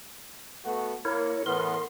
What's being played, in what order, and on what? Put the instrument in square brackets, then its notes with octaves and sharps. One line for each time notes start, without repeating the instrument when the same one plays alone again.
[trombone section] A3 B3 F#4
[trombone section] A#3 [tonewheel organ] E4 A#4 C#5
[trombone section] A2 E3 B3 [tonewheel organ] A#4 C6